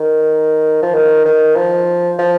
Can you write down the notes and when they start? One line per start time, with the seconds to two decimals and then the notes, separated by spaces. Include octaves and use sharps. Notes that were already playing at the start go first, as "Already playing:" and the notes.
Already playing: D#3
0.82 F3
0.94 D#3
1.25 D#3
1.55 F3
2.19 F3